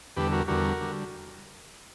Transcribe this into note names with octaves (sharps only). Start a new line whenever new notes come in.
E2 D3 G3 G4 B4
F#4 A#4
E2 D3 G3 F#4 A#4
D3 G3